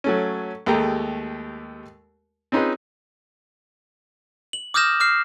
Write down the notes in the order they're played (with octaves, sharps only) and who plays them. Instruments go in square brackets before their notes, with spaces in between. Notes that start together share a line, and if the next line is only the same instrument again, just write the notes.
[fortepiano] F#3 A3 C#4
D#2 G#3 A3 G4 A#5
C4 C#4 D#4 F4 G#4 B4
[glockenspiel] F#7
D6 D#6 F6 G6 A#6 E7
D6 F6 C7